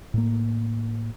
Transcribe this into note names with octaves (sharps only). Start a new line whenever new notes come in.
A2 A#3